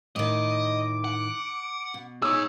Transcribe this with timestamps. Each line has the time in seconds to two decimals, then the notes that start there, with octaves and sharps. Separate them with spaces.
0.16 A2 D#3 D#5 D6
1.04 F#5
1.94 B2
2.22 D#4 G#4 C#5 E6